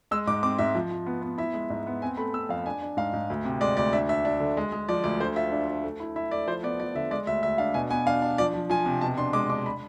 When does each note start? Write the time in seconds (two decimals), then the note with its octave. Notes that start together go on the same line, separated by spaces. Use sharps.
0.11 G#3 E6
0.27 G#2 D6
0.43 C4 D6
0.59 G#2 E5
0.75 F3
0.91 F3
1.06 B3
1.22 B3
1.38 E4 E5
1.54 G#3
1.70 G#2
1.87 B3
2.02 C4 G#5
2.17 A3 B5
2.34 C4 E6
2.49 F2 F5
2.66 D4 G#5
2.82 D4
2.97 G#2 F5
3.13 G#2
3.30 D2
3.45 C3
3.61 G#3 D5
3.77 D2 D5
3.93 D4 E5
4.09 D4 E5
4.25 D4
4.40 D3
4.57 G#3
4.72 G#3
4.88 F3 D5
5.04 D2 D5
5.20 D3 C5
5.36 F4 E5
5.52 D4
5.68 D4
5.84 A3
6.00 E4
6.16 E4 E5
6.31 A3 D5
6.48 F3 C5
6.63 B3 D5
6.79 F3 D5
6.95 D3 E5
7.11 G#3 D5
7.27 D2 E5
7.42 D2 E5
7.58 D4 F5
7.74 B2 G#5
7.90 B3 G#5
8.06 D4 F5
8.22 D4
8.38 F3 D5
8.54 F3
8.70 F3 G#5
8.86 C3
9.01 B2 A5
9.17 D4 C6
9.33 G#3 D6
9.49 D4 D6
9.66 B5